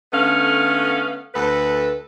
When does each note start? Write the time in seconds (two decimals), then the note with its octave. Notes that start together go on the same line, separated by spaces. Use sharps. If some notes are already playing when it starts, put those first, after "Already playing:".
0.13 D3 A3 B3 C#4 F5
1.35 D2 A4 B4